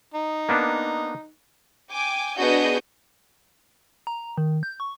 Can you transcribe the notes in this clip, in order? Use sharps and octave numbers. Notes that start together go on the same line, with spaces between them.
D#4
A#3 B3 D4
G5 G#5 D6
B3 D4 F#4 G#4 D#5 G6
A#5
D#3
G6
C#6